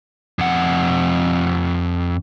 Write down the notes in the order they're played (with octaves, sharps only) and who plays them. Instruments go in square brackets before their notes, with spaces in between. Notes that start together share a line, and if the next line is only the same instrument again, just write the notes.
[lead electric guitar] F2 F#5